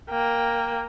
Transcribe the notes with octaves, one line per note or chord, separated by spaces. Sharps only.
A#3 G5